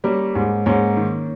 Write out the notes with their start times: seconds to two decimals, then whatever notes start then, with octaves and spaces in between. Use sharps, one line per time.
0.04 G3 A#3 C#4
0.35 G#2
0.66 G#2 A#3 C#4
0.97 D#3